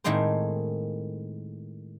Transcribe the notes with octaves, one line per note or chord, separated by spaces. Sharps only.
A2 D#3 G#3 A#3 C4 C5